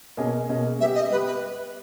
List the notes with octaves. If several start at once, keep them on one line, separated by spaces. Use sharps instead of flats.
B2 A#3 C#4 G#4 D#5
B2 A#3 C#4 G#4 D#5
G3 B3 G4 E5
D#5
G3 B3 G4 B4
B4